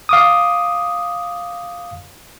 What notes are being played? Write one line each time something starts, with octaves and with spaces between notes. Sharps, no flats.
F5 D6 D#6